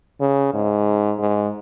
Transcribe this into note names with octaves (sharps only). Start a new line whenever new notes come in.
C#3
G#2
G#2